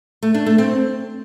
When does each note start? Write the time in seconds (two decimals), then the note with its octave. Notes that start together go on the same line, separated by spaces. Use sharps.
0.23 A3
0.34 D4
0.46 A3
0.58 C4